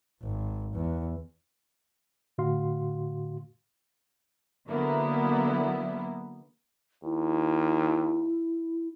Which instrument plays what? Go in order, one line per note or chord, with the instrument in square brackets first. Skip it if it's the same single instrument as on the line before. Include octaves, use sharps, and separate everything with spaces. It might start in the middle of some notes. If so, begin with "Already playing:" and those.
[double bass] G#1
E2
[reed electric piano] A2 D3 F#4 F5 C6
[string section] D3 F#3 A#3 B3 E4
[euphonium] D#2 [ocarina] E4